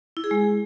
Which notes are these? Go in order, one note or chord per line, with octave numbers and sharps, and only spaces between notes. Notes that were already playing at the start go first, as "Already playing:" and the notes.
E4
G#4
G#3